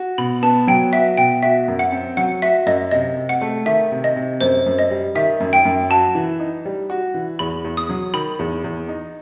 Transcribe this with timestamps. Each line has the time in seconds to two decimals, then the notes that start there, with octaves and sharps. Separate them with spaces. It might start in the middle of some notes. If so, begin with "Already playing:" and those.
Already playing: F#4
0.18 B2 B5
0.42 B3 A5
0.68 F#3 G5
0.92 F#4 E5
1.18 B2 G5
1.42 F#4 E5
1.68 F#2
1.79 F#5
1.92 C4
2.17 F#3 F#5
2.42 F#4 E5
2.66 F#2 D#5
2.91 C3 D#5
3.17 C3
3.29 F#5
3.41 A3
3.66 D#3 E5
3.91 C3
4.04 D#5
4.16 C3
4.41 F#2 C5
4.66 F#2
4.79 D#5
4.91 G3
5.15 D#3 E5
5.40 F#2
5.53 G5
5.65 F#2
5.90 F#4 A5
6.15 E3
6.40 D#4
6.65 G3
6.90 F#4
7.14 E3
7.39 E2 B5
7.65 E2
7.77 D#6
7.89 F#3
8.14 D#3 B5
8.39 E2
8.64 E2
8.88 D#4